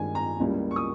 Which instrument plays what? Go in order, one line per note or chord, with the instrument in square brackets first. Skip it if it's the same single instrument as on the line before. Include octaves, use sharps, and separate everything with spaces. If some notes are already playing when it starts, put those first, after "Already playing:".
Already playing: [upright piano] G2 D#3 G#3 G#5
A#5
C#2 C#3 G3 A#3 E4
C#6
D#6